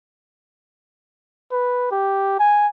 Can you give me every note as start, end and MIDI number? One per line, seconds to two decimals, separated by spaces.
1.52 1.90 71
1.91 2.35 67
2.40 2.67 80